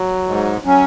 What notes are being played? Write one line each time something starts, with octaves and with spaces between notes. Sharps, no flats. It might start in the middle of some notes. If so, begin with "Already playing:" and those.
Already playing: F#3
G#2
F#3 C#4